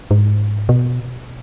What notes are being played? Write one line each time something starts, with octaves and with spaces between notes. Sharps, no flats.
G#2
B2